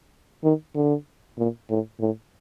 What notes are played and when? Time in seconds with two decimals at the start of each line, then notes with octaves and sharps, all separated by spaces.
0.43 D#3
0.75 D3
1.38 A#2
1.69 A2
2.00 A2